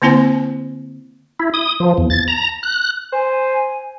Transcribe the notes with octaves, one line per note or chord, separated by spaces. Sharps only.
D3 A#3 C4 E4 C5 G#5
E4
D#6
F3
E2
A6
A#5
F#6
C5 G#5